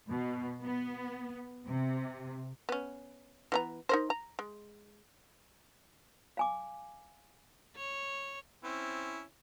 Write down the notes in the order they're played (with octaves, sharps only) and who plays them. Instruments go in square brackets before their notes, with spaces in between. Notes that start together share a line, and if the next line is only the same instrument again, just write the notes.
[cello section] B2
B3
C3
[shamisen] B3 C#4
E3 B3 A#5
D#4 A#4 C5
A#5
G#3
[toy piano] F5 G#5 D6
[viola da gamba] C#5
[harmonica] C4 C#4 E4